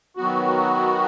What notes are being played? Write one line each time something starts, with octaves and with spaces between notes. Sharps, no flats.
D#3 F#3 B3 F#4